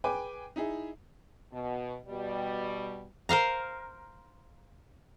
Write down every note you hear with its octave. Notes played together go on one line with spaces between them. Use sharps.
G#4 B4 G5 G#5 D6
D#4 E4 G#4
B2
B2 G3
A#4 C5 F5 A#5